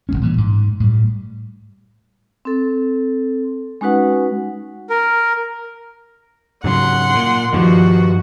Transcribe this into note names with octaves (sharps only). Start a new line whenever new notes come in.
D#1 B1 G#3 C#4
A#2 E3 G3
G#2
A2 G3
C4 A4
G#3 C#4 D#4 F#4 B4 F#5
A#4
G#2 C#3 F#3 F#5 C6
A#2
G2 D#3 F3 F#4